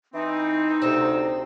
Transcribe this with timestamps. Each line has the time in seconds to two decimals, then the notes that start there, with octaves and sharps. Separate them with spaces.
0.13 E3 C4 D#4
0.82 D2 C3 C4 E6